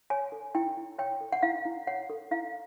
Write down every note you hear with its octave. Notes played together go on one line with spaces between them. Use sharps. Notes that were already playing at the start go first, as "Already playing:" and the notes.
C#5 G#5
A4
E4 G5
E4
C#5 G5
A4
F#5
E4 F5
E4
C#5 F#5
A4
E4 F5